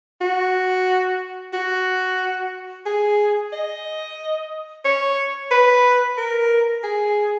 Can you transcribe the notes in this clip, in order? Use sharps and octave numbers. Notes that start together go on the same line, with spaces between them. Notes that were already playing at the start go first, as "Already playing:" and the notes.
F#4
F#4
G#4
D#5
C#5
B4
A#4
G#4